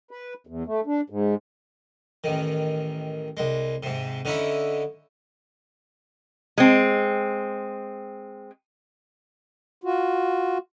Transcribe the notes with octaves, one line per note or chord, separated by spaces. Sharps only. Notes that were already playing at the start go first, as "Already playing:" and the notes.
B4
E2
A3
D4
G#2
A1 D#3
C2 G#3
G#2 C3
D3 C#4 D#4 E4
G#3 C4
F4 F#4